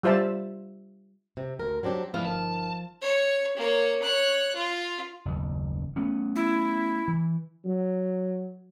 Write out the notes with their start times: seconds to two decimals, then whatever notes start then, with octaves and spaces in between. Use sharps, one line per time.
0.03 G3 F4 C5 E5 A5
1.37 C3
1.60 D2 A#4
1.83 F#3 C4 D4 G4
2.14 F3 A3 B3 E4 B4 F5 B5 F6
2.25 G1 D#4 A#4 A5
3.02 C#5
3.56 A#3 C#5
4.02 C#5 F#6
4.55 F4
5.25 F#1 D#2
5.96 A3 B3 C#4
6.36 E4
7.08 E3
7.65 F#3